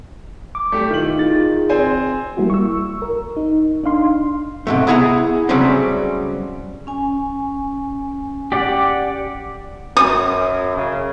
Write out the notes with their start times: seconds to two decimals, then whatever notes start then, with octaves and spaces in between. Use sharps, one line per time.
0.55 D6
0.72 A3 G4
0.91 D#3 E4 F4 F#7
1.18 D#4 F4 G#4 A6
1.69 C4 C5 G#5
2.37 G3 A#3 E4 F#4
2.50 C#6 E6
3.02 A#4
3.37 D#4
3.83 D4 D#4 F5 C6
4.67 G#2 C3 A3
4.87 B3 E4 G#4 F#5 G#5 A#5
5.49 C#3 F#3 G3 A3 C4 C#4
6.87 C#4 G#5
8.52 G4 D5 F#5
9.97 F#2 D#6
10.77 C#3